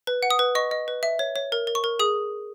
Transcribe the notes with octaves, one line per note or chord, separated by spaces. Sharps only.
B4
F#5
D#6
B4
D#5 C#6
D#5
B4
E5
C#5
C#5
A#4
A#4
C#6
A#4
G#4 D#6